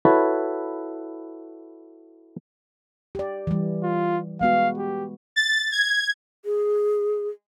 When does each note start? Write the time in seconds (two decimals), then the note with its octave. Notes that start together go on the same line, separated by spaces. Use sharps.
0.05 E4 F#4 A4 B4 C#5
3.15 G4 D5
3.47 E3 G3
3.83 F4
4.41 G#3 B3 F#4 F5
4.78 G4
5.36 A6
5.72 G#6
6.45 G#4